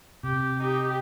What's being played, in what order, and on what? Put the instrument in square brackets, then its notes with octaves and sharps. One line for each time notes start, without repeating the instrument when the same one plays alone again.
[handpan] C3 [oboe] G4
[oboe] D#4 [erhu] G4